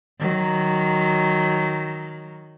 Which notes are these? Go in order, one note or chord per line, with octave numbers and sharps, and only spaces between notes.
D#3 F#3